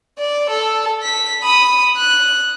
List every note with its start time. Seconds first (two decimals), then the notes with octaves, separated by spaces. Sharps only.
0.18 D5
0.50 A4
1.03 B6
1.43 B5 D#6
1.97 F#6